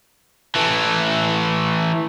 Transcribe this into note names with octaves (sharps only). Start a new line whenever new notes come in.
E3 A3